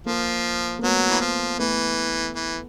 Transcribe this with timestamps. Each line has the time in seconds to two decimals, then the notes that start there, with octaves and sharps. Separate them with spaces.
0.06 F3 A#3
0.79 A#3
0.83 F#3 A3 B3
1.10 E3
1.21 F3
1.59 E3 A3 B3
2.36 E3